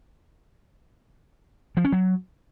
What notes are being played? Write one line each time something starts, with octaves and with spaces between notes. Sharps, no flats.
F3
C#4
F#3